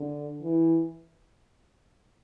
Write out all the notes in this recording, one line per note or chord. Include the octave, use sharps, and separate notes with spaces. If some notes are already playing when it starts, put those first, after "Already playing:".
Already playing: D3
E3